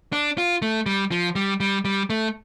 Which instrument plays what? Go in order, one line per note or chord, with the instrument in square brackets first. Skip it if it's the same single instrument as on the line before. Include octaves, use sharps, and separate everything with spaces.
[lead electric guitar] D4
F4
A3
G3
F3
G3
G3
G3
A3